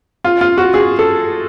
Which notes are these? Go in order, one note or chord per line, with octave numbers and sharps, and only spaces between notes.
F4
F4
F#4
G#4
A4